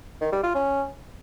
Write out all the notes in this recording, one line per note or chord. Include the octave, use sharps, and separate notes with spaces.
D#3
G3
F4
C#4